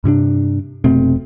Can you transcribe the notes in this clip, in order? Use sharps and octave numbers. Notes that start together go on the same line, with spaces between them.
G2 C3 C#4 D4
F1 B2 A3 C4